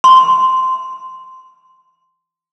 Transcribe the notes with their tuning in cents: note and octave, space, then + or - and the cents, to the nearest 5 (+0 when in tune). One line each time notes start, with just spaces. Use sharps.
C6 -10